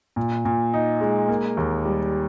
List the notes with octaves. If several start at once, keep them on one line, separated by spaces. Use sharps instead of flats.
A#2
A#2
D#4
G#3
A#3
D#2
G3